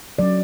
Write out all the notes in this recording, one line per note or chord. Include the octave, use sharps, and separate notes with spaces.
F#3 C#4 D5